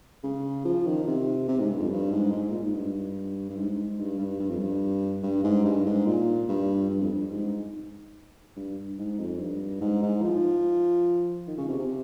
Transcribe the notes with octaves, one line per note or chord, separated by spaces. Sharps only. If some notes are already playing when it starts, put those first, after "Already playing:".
C#3
F3
D#3
C3
C3
G#2
G2
F2
G2
G#2
G#2
A#2
G#2
G2
G2
G#2
G#2
G2
G2
G2
F2
G2
G2
G#2
G2
G#2
A#2
G2
G2
F2
G2
G#2
G2
G#2
F2
G2
G#2
G#2
F3
D#3
C#3
C3
C3